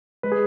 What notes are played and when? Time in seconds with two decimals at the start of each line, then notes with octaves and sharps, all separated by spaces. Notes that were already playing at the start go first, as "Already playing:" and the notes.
0.23 G#3 B4
0.32 G#4